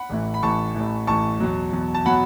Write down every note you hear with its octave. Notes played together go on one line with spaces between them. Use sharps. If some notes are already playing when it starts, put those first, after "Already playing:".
Already playing: F#5 B5
A1 A2 E3
B5
A1 A2 E3 A5 C#6
A1 A2 E3
A1 A2 E3 A5 C#6
E2 B2 F#3
E2 B2 F#3
A5
B2 F#3 F#5 B5